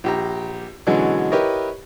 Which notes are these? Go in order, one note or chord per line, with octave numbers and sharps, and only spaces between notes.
A#1 G4 A#5
B2 D3 E3 F#3 G#3 C#4
E4 G4 A#4 B4 C#5 D#5